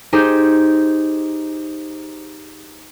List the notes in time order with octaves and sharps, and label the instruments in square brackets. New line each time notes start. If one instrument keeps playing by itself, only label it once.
[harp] D#4 G4 G#4 C5